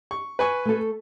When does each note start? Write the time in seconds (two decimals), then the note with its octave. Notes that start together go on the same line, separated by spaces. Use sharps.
0.11 C#6
0.39 B4 G#5 C#6
0.65 A3 A4